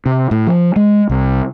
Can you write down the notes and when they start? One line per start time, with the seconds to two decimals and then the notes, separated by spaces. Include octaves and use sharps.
0.06 C3
0.31 A2
0.47 F3
0.76 G#3
1.10 C2